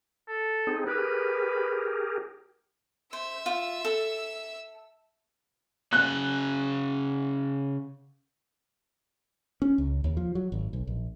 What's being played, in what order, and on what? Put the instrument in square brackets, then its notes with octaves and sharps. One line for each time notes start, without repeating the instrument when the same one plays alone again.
[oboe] A4
[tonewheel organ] C4 D#4 G#4
[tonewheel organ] G4 G#4 A#4 [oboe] B4
[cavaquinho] C5 [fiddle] E5 E6
[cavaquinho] F4
A4
[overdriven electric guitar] C#3 F#4 [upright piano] F#6
[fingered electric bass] C#4
C#2
D#2
F3
F#3
G#1
B1
A#1